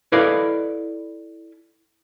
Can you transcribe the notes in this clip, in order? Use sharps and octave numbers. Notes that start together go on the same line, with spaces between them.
E4 A4 B4 D5 D#5 F5